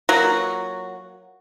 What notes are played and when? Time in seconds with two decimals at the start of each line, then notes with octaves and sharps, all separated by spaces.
0.09 F#3 A#3 F4 F#4